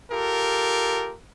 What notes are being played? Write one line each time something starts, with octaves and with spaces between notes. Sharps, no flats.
F4 G4 A4 A#4